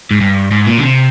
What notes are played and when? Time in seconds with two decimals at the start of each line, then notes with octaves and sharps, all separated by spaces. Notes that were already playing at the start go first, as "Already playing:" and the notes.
0.11 G#2
0.21 G2
0.51 G#2
0.67 A#2
0.78 D3
0.82 C3